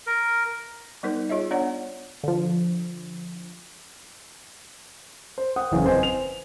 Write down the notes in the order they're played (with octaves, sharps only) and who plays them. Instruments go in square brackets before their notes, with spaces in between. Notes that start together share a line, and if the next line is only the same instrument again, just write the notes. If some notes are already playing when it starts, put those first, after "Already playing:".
[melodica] A#4
[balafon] G3 B3 D#4 A#4 C5
F4 G#4 C#5 D#5 E5
B3 D4 C#5 D5 F#5
[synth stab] D3 F3
[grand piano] C5
F#5 G5 D#6
F#1 E2 C#3
C4 B4 C5 D#5 G#5
F7